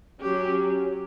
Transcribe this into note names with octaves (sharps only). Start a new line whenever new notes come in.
F#3 C#4 G4